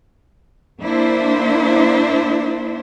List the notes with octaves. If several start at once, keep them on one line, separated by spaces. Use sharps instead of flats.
A#3 D4 E4 C5